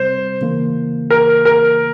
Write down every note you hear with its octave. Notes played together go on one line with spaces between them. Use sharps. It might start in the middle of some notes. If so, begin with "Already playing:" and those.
Already playing: C3 G3 C4 C5
C#3 E3 A#3
A#4
A#4